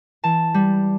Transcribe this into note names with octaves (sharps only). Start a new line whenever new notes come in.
E3 A5
G3